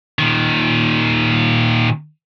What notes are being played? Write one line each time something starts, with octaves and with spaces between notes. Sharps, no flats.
A#2 D#3